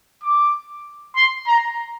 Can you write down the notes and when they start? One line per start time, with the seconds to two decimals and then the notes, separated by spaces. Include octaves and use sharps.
0.23 D6
1.16 C6
1.47 A#5